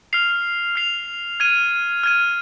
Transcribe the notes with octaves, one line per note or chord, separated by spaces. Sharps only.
F6 C7 F7
F6 C7 F7
F6 G#6 D#7
F6 G#6 D#7